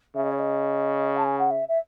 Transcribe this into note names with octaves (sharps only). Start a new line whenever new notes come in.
C#3 E5
D#5
C#5
D#5
A5
G#5
F#5
E5
E5